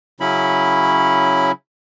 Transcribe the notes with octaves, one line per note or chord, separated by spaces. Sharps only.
C#3 F#3 C#4 E4 B5